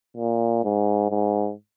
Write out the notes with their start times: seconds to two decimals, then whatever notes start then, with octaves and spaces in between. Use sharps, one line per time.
0.17 A#2
0.64 G#2
1.10 G#2